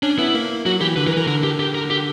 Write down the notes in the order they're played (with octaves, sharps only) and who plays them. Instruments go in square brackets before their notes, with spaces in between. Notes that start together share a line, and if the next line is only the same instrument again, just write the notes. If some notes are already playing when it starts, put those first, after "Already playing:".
[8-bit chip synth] C#4 [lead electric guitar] D4
[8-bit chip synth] B3 [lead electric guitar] E4
[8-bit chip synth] A#3
[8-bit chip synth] F#3 [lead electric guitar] F#4
[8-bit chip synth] E3 [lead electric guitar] G4
[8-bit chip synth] D3 [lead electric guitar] B4
[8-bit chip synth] E3 [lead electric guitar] A#4
[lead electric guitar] B4
[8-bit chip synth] E3 [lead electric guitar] A#4
[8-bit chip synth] D3 [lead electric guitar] A#4
[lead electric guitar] G4
G4
A#4
G4